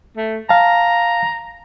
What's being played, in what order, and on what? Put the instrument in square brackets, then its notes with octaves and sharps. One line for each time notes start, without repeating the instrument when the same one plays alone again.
[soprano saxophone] A3
[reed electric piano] F5 A5 [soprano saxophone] A#5